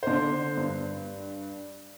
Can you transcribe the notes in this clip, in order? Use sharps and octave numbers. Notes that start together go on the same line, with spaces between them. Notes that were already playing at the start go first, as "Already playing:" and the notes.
D3 C5
G2